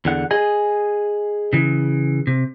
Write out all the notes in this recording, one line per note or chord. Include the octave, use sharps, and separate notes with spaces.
E2 D3 F#5
G#4 D#5 G#5
C#3 E3
C3